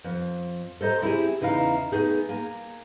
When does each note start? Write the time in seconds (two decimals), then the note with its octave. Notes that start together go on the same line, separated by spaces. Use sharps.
0.04 F2
0.81 A4 C5 D#5 A#5
1.01 C4 E4 G4 G#4
1.41 E2 C#3 D#4 E4 F5 A#5
1.92 A3 B3 D#4 G#4
2.29 A#3 G#5 A#5